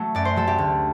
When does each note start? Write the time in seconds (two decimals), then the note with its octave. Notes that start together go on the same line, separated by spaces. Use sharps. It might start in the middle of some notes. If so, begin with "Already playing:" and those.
Already playing: F#3 A3
0.15 F#2 D5
0.25 C5
0.36 F#3 A3 A4
0.48 G4
0.58 D2